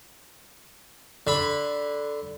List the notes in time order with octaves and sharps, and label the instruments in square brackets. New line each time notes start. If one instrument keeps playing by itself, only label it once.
[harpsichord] D3 B5